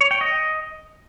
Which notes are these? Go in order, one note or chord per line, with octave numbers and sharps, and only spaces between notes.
C#5
G5
D#5